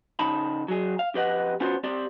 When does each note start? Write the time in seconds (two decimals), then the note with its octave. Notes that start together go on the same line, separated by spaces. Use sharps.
0.19 C#3 D#4 A5 B5
0.68 F#3 G#4
0.99 F5
1.14 F2 G4 B4 D#5 F#5
1.60 B3 C#4 F4 F#4 C5
1.84 C4 G4 D5